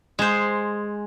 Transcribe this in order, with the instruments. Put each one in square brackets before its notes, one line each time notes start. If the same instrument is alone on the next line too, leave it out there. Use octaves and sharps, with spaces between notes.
[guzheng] G#3 C5